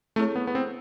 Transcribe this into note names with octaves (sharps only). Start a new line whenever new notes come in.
A3 C4 E4 G#4 C#5
B3
B3
C4